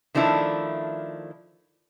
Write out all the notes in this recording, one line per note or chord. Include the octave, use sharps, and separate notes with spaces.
D#3 F3 A3 D4 E4